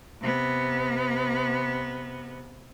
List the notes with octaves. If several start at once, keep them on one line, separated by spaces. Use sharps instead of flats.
C3 B3